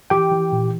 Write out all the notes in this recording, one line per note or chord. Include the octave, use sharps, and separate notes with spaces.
E3 G4 G5
E3
A#2